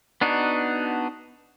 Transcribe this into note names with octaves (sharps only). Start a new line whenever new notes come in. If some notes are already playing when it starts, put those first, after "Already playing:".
B3 D4 D#4 F#4